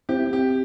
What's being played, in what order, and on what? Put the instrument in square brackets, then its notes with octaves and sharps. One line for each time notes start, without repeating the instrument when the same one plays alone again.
[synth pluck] C4 E4 [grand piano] G4
[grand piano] G4